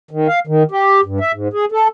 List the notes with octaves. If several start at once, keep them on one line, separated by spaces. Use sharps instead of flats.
D#3
F5
D#3
G4
G2
E5
G#2
G#4
A4